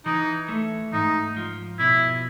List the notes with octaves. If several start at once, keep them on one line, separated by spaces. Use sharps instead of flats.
E3 D#4
A3
G#2 D#4
F3
B2 E4